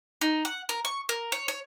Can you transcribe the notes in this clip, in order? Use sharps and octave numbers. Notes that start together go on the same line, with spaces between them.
D#4
F#5
A#4
C#6
A#4
C#5
C#5